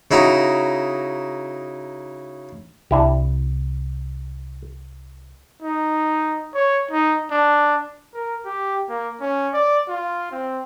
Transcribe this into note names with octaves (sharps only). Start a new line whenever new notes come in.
C#3 D#4 E4 F#4 A#5
C2 D4 E4 G4
D#4
C#5
D#4
D4
A#4
G4
A#3
C#4
D5
F4
C4